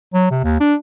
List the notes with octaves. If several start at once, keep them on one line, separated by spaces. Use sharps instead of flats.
F#3
C3
D#2
D4